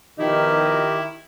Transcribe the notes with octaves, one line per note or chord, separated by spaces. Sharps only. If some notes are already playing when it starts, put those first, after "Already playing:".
B2 D#3 F3 D#4 E4 G4 A#4